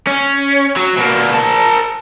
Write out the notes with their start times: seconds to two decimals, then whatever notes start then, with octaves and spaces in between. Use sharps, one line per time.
0.07 C#4
0.77 F#3
0.97 B2 A#3
1.34 A#4 A5